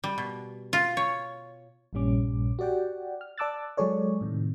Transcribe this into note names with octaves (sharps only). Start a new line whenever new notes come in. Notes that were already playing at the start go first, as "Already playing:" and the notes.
G3
B2
F4
C#5
A#1 G2 A#2 G3 C#4 D6
F#4 G4 D5 F#5 G5
F6
D5 A5 D6 E6 F#6 A6
F#3 G#3 G#4 A4 C#5 D5
A2 C3 D#3